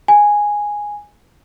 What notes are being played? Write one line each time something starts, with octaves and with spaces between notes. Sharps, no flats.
G#5